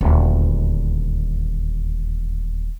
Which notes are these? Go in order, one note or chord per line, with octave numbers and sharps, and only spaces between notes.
D#1 D2